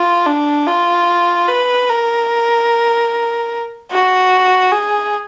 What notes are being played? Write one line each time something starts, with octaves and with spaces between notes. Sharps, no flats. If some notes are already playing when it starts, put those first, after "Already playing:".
Already playing: F4
D4
F4
B4
A#4
F#4
G#4